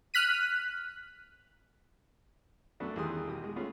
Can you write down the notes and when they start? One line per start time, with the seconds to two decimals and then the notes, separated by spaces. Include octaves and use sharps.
0.14 F6 F#6 B6 D#7
2.80 F#2 A3 B3 D4 F#4
2.96 E2 D#3 G3 G#4 C6 D#6
3.28 B2 G4 D#6
3.44 G#3
3.56 A3 B3 C#4 F4 G#4